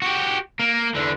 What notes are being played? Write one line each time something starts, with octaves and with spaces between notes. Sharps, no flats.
F#4 G4
A#3
E2 D3